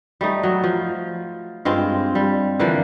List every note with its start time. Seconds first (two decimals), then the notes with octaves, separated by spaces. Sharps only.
0.21 G3 A3 D#4
0.43 F#3
0.64 F3
1.65 G2 G#3 C4 F4
2.15 G3
2.59 D3 E3 F3 A#3